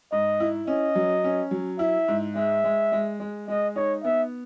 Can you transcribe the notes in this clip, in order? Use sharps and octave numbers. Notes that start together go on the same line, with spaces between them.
G#2 D#5
E4
C#4 D#5
F#3
C#4
F#3
E4 E5
G#2
G#3 E5
G#3
G#3
G#3
G#3 D#5
D#4 C#5
B3 E5